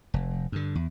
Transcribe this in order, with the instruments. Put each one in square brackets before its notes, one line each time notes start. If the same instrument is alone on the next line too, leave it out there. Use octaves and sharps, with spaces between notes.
[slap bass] F1
G2 D3
E2